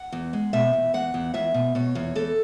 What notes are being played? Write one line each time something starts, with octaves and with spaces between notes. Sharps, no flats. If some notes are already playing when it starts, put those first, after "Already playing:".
Already playing: F#5
E2
G#3
B2 E5
E2
E2 F#5
E2
E2 E5
B2
B2 C#5
E2
E2 A4